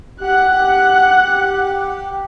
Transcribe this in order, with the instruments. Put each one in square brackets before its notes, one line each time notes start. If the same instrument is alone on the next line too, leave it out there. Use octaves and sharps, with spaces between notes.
[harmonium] G4 [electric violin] F#5 F#6